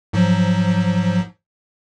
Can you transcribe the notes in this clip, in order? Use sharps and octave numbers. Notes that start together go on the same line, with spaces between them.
G#2 F3 F#3